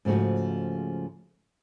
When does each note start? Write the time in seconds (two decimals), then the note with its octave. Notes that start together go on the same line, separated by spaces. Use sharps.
0.05 G#2 C#3 F3 A3 F#4